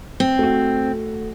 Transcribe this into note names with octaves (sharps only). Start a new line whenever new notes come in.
C4
A3 F#4